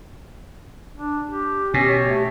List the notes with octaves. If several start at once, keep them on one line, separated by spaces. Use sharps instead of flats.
D4
G4
B2 C#4 G4
C#5
A3